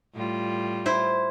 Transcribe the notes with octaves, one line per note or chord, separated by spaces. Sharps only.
A2 G3 F4
E4 C5